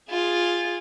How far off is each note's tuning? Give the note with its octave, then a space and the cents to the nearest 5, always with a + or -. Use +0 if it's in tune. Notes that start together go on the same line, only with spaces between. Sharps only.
F4 +0 G#4 -10